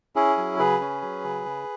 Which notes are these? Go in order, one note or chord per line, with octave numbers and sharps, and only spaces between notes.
C#4 E4 G#4
F#3
C#3 G#4 B4
C#4
F#3
C#3
C#3